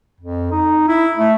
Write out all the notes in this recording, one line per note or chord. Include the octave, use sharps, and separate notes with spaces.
F2
D#4
E4
A3